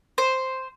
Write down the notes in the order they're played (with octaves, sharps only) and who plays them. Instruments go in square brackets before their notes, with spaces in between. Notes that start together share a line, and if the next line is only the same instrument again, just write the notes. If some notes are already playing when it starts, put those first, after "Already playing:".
[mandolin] C5